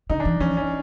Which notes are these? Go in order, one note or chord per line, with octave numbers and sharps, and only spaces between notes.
D3 D#4
D4
E3
F3 C#4
C#4